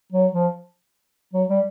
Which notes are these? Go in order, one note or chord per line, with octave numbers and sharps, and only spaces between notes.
F#3
F3
F#3
G3